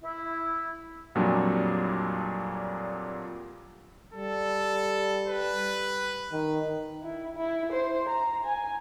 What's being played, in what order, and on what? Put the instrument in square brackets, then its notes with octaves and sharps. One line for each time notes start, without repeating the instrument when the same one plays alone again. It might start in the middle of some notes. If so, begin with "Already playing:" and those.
[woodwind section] E4
[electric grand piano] F2 A#2 F#3 G3 D4
[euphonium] G3 [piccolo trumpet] A4
[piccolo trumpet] B4
[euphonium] D#3
[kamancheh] E4
E4
C5
A#5
G#5